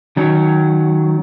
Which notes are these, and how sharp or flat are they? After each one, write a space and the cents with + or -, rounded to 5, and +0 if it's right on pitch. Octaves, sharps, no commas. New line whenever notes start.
D#3 +0 F#3 +0 C#4 +25